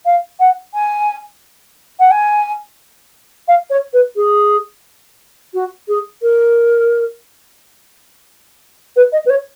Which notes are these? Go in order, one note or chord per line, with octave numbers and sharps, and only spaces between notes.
F5
F#5
G#5
F#5
G#5
F5
C#5
B4
G#4
F#4
G#4
A#4
B4
D#5
B4
C#5